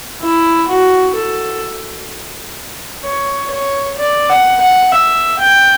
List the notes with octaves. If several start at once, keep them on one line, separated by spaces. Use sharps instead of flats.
E4
F#4
A4
C#5
C#5
D5
F#5
F#5
E5
G5